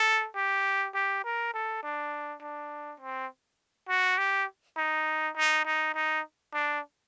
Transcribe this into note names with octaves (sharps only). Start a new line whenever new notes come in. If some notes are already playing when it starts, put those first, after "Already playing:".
Already playing: A4
G4
G4
A#4
A4
D4
D4
C4
F#4
G4
D#4
D#4
D#4
D#4
D4